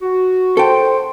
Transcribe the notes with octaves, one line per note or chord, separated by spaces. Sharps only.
F#4
A4 C5 G5